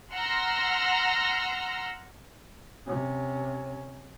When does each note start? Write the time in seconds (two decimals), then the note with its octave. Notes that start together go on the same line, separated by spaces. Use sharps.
0.13 F#5 A#5 C6 E6 F6 A#6
2.86 C3 C#4